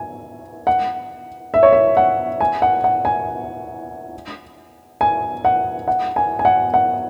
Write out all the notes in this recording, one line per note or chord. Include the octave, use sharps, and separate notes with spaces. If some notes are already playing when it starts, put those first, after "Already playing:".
Already playing: G#5
F#5
E5
C#5
E5
F#5
G#5
F#5
F#5
G#5
G#5
F#5
F#5
G#5
G#5
F#5
F#5